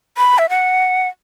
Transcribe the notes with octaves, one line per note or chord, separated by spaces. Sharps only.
B5
E5
F#5